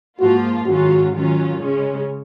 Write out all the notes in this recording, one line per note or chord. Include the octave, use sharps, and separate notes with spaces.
G#2 F3 A#3 F4 F#4
G#2 D#3 F#3 C#4 F4 F#4
D#3 F#3 C#4 F4
C#3 G#3 C#4